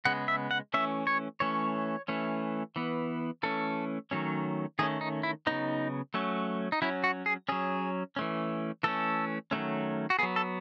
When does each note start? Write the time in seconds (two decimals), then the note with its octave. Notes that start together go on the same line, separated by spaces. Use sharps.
0.05 C#3 G#3 B3 F#5
0.28 E5
0.51 F#5
0.74 E3 A3 C#4 E5
1.07 C#5
1.40 E3 A3 C#4 C#5
2.08 E3 A3 C#4
2.76 E3 B3
3.43 E3 A3 C#4 A4
4.11 D#3 F#3 A3 C#4
4.79 D#3 A3 C#4 G#4
5.01 D#4
5.23 E4
5.47 C#3 F#3 B3 D#4
6.14 F#3 A3 C#4
6.72 D#4
6.82 F#3 C#4 E4
7.04 F#4
7.26 G#4
7.49 F#3 C#4 G#4
8.16 E3 A3 C#4
8.83 E3 A3 C#4 A4
9.51 D#3 F#3 A3 C#4
10.10 F#4
10.19 F#3 B3 G#4
10.36 A4